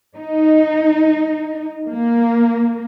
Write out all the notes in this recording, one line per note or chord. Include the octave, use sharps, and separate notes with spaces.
D#4
A#3